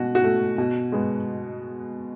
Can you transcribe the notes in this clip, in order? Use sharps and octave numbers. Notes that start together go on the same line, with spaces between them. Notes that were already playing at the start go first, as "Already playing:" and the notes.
Already playing: B2 F#4
F#4
A3
B2
G#3 B3